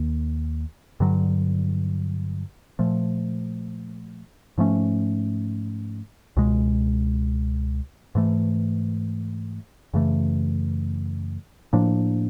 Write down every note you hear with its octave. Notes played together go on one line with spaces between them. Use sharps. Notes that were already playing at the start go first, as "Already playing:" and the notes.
Already playing: D#2 D#3 A#3
G2 D3 F#3
A#2 F3 A3
G#2 F3 A3 C#4
C#2 B2 G#3
G#2 E3 A3
F#2 C#3 E3 A3
A2 F3 A#3 D4